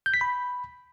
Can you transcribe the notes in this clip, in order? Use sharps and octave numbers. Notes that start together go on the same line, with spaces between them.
G6
B6
B5